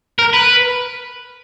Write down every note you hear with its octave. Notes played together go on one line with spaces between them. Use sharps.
A#4
B4